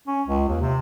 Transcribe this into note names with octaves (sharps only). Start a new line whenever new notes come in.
C#4
C#2
D#2
C3